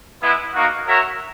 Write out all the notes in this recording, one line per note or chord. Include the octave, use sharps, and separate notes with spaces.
G#3 B3 E4
A#3 D#4 F#4
F#4 A#4 C#5 E5